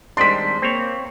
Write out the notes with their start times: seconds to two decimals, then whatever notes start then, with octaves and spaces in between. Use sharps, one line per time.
0.17 D#3 G3 G#3 C4 D4 C6 B6
0.62 A#3 C4 C#5